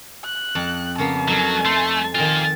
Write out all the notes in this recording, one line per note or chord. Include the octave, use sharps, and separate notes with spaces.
F#6
F2 A5
C#3 A#3 B3 A5
F#3 D#4 A4 F5
A3 C5 C6
F2 D#3 A#3 F4 G#5